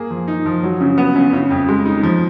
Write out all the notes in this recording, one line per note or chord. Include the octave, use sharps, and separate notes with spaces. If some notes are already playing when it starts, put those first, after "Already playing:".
Already playing: A#3 G#4
F3
D#4
F3
F#3
C#3
B3
C#3
C#3
F2
G#3
D#4
F3